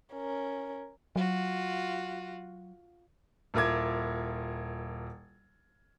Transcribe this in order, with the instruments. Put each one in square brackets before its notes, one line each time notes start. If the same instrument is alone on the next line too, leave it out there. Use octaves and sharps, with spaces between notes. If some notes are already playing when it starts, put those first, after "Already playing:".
[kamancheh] C#4 A#4
[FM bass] F#3 [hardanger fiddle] F4 F#4
[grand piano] D#1 E4 F4 A#4 D6 G#6